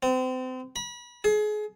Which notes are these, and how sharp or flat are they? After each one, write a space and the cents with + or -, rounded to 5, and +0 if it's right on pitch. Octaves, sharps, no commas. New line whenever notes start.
C4 -35
B5 -35
G#4 +30